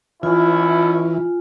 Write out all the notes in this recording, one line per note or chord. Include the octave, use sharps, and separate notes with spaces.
B2 E3 C#4 E4 F4 G#5